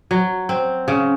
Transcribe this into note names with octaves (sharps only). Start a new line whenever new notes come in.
F#3
C4
C#3